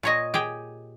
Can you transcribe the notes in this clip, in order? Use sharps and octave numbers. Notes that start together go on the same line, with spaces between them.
A#2 C#5 D#5
G4 G#4 G5